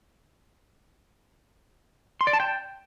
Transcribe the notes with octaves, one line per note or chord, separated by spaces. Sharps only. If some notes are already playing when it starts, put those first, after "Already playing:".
C6
D5
A5
G5